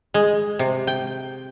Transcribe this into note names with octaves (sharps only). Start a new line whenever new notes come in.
G#3
C3
G5